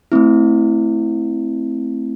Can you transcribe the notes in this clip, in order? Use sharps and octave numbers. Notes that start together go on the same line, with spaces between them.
A3 C4 E4